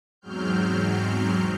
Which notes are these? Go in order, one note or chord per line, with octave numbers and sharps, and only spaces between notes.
E2 G#2 F#3 C4 F6 G6